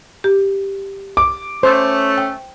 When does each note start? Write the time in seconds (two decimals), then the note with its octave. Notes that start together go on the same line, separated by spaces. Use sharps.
0.24 G4
1.17 D6
1.63 A3 C#4 C5
2.18 G5